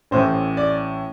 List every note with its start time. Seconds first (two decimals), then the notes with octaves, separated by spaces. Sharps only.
0.11 A1 A2 E3 C5
0.57 D5